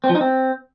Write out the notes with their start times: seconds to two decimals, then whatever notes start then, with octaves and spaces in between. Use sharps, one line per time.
0.04 C4
0.09 F3
0.15 D#4
0.21 C4